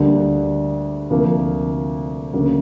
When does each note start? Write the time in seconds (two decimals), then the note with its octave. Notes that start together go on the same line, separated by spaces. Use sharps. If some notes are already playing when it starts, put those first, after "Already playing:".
Already playing: D2 D3 G3 A#3 D4
1.10 D2 C3 F3 A#3
2.33 D2 C#3 F#3 A#3